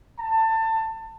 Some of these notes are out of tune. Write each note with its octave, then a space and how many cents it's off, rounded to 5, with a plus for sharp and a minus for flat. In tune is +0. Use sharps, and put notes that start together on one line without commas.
A5 +25